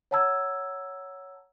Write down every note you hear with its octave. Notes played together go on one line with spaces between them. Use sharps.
C#5 F#5 A5 A#5 E6 G#6